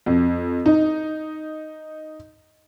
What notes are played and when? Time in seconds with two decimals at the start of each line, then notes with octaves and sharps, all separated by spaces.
0.06 F2
0.66 D#4